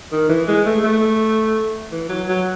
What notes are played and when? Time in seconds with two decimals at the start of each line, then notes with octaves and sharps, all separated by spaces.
0.12 D#3
0.30 E3
0.48 G#3
0.66 A3
0.84 A3
1.92 E3
2.10 F#3
2.29 F#3